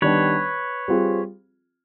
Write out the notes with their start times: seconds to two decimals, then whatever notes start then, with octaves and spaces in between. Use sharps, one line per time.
0.02 D#3 G3 B3 D4 B4 C#5
0.88 G3 C4 F4 G#4